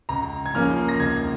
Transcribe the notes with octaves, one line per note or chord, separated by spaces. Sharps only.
C#2 A#5
G#6
C#3 F3 A#3 C#4 F6
A#6
C#2 G#6